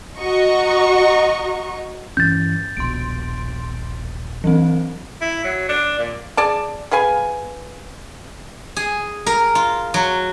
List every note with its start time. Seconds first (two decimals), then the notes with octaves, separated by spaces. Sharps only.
0.18 F#4 D#5 A#5 C#6
2.17 G2 E3 C#4 G6 A6
2.77 D#1 A#1 B2 C6 D7
4.44 E3 F#3 C4
5.21 E4
5.44 F#3
5.69 D4
5.99 A#2
6.37 G#4 D5 A5
6.91 G#4 B4 F5 G#5
8.76 G#4
9.26 A#4
9.55 F4
9.94 F#3